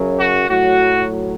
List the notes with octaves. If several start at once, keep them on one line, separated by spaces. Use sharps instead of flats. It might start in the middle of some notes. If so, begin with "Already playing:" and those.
Already playing: F#2 C#3 F#3
F#4
A2 F#3 F#4